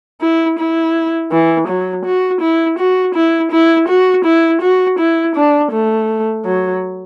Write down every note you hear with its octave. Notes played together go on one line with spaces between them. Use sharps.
E4
E4
E3
F#3
F#4
E4
F#4
E4
E4
F#4
E4
F#4
E4
D4
A3
F#3